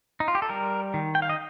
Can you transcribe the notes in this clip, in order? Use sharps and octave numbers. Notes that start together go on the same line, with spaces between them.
D#4
F4
G4
A4
G3 A#4
D#3
G5
F5
D#5